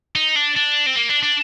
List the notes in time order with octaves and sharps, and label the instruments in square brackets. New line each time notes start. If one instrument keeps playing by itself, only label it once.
[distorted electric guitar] D#4
D4
D4
C4
A#3
D4
D4